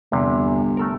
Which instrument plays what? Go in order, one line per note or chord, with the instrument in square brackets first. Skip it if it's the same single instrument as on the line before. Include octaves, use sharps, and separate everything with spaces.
[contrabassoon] G1 [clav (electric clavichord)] E2 C3
[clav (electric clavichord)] A3 A4 A#4